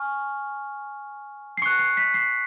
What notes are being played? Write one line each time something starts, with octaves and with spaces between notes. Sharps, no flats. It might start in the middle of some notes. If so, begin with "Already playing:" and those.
Already playing: G#5 C#6 F6
C7
C#6 F#6 C#7
C7
B6
C7